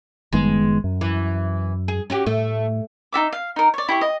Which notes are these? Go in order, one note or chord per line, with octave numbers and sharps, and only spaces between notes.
F#1 D#3 G#3 B3
F#2
E3
G#4
C#4 F#4 G4
A2 A3
D#4 F#4 E5 D6
F5
D#4 A#4
C#5 D5
E4 G4 C#6
D#5